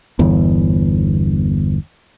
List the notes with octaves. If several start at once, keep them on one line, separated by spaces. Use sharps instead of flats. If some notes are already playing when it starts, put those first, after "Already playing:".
G1 E2